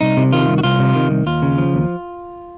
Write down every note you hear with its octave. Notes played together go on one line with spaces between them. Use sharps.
C2 D#4
C3
D#3 F4
C2
F#4
C2 F4
C3
D#3
C2
D#2 F4
C#3
F3
D#2